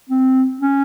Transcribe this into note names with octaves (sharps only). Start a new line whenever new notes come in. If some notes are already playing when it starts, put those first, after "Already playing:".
C4
C#4